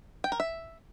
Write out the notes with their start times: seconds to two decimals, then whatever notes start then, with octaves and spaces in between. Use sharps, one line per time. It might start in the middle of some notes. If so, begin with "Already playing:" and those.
0.24 G5
0.32 A#4
0.40 E5